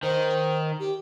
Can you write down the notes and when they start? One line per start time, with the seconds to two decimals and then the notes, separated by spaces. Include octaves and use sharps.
0.03 D#3 C5
0.80 G4